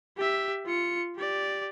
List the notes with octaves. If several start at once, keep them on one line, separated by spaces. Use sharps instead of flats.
G4 E5
F4 C#7
G4 D5